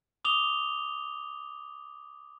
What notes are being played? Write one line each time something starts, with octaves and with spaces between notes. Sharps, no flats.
D6 D#6 F7 G7